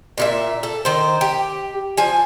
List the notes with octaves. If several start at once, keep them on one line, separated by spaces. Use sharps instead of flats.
A#2 F4 E5
A4
D#3 C5
G4
F3 G#5